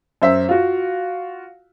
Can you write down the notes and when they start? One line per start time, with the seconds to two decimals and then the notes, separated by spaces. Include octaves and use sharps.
0.22 F#2 C5 E5
0.49 F4 F#4